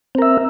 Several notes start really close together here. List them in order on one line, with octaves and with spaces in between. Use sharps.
C4 A#4 E5